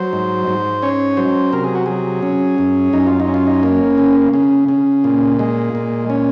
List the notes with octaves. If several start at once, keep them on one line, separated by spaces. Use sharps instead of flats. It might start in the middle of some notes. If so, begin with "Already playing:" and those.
Already playing: F#3 C5
G#2
G#2
C#4 C#5
F#3 C5
C3 A#4
G#4
F#4
F#3 G#4
C#4
F#2
F#2 D#4
F4
D#4
C#4
F4
D#4
A#3
C#3
C#3
C#3
A#2
G#3
A#2
C#4